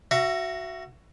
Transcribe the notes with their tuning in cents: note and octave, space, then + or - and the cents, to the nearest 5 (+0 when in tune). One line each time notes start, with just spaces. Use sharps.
F#4 +0 E5 +30 A#5 +0